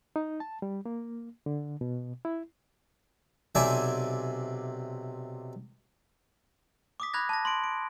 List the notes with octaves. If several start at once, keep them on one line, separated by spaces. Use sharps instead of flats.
D#4
A5
G3
A#3
D3
B2
E4
B1 C3 D5 E5 G#5 A5
D6 D#6 B6
B5 F#6 G#6 A#6
A5 A#6
C6 D7
D7